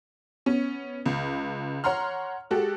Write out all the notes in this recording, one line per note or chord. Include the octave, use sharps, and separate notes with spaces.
B3 C#4
C#2
C#5 F#5 A#5 C6 F6
G#3 F#4 G4 A4